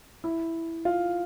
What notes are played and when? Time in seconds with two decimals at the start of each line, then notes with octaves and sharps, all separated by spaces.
0.24 E4
0.85 F4